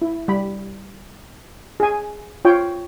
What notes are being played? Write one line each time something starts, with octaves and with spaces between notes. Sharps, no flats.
E4
G3 B5
G#4 G#5
F4 C#5 G5